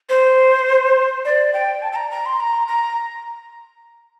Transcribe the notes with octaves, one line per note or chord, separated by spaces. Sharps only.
C5
D5
G5
A5
A5
A#5
A#5
C6
A#5
A#5